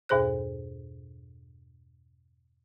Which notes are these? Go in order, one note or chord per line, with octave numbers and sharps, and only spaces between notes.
E2 G2 B2 G#4 C5 F#6